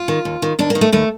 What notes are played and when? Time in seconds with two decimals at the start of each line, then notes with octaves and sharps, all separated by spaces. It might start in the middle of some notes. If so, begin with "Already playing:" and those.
Already playing: F4
0.08 D#3
0.25 D#2
0.42 D#3
0.59 D#2 D4
0.70 A#3
0.75 D#3
0.81 A3
0.92 D#2 A3